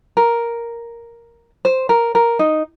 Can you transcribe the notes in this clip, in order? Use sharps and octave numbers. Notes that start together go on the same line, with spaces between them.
A#4
C5
A#4
A#4
D#4